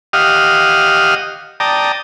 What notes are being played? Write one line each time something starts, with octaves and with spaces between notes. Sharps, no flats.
G4 D#5 F5 F#5 D#6 F6
D5 G5 A5 A#5 D#6